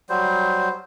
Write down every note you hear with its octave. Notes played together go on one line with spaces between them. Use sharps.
F#3 G3 C5